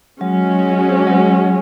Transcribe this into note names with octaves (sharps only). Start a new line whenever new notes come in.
F#3 G#3 C#4 F#4
F#3